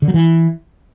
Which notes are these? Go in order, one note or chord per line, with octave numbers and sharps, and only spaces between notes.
D3
F#3
E3